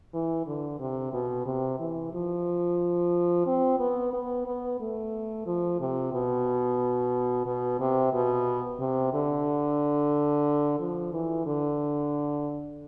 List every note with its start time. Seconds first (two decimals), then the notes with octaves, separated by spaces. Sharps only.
0.13 E3
0.46 D3
0.79 C3
1.13 B2
1.46 C3
1.79 E3
2.13 F3
3.47 C4
3.79 B3
4.13 B3
4.46 B3
4.80 A3
5.46 F3
5.80 C3
6.13 B2
7.46 B2
7.80 C3
8.13 B2
8.80 C3
9.13 D3
10.79 F3
11.13 E3
11.46 D3